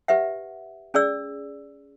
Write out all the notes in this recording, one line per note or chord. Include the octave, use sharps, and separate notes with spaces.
G4 B4 E5 F#5
C#4 G#4 D5 E6